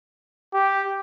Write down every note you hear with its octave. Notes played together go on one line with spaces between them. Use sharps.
G4